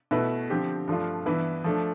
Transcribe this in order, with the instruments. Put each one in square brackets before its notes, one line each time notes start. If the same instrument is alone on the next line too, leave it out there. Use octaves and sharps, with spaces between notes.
[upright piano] B2 A3 E4 B4
D3 F3 C4 G4
G2 F3 A3 D4 F4
G2 E3 B3 E4 B4
F3 A3 D4